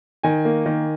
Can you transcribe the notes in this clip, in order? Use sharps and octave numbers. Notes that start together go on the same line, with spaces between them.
D#3 G#5
A#3
D#3